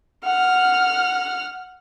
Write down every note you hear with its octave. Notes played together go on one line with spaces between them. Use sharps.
F#5 F6